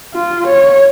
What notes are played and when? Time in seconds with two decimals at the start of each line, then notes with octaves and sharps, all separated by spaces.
0.14 F4
0.47 C#5